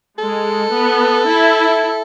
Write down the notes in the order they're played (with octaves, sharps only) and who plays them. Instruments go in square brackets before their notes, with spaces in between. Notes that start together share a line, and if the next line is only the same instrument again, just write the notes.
[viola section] G#3 [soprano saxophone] A4
[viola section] B3
E4